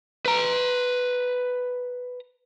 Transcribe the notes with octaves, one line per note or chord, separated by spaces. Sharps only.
B4 A#5